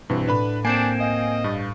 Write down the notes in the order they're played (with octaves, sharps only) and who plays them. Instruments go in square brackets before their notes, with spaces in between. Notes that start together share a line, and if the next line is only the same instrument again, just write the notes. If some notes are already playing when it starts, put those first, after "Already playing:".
[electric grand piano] G2 E3 C4 [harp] B2
[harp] A2 [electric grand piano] D4 B4 B5
[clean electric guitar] A#3 C4 [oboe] D4 [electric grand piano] G#5 G6 [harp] A6
[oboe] D#5 [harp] F5
[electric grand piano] G2 [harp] B5 C#6 A6